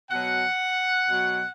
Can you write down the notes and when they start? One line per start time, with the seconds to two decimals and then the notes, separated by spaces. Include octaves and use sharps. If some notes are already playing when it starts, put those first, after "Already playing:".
0.11 B2 F#3 F#5
1.08 B2 F#3